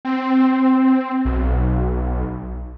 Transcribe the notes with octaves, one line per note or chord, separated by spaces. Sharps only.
C4
B1